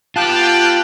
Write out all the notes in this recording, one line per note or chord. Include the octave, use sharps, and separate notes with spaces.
B3 F4 G4 G5 A5 F#6